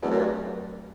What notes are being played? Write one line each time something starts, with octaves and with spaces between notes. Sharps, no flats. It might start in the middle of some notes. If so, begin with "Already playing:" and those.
E2 F#3 A3 C4 F#4
F#2
G2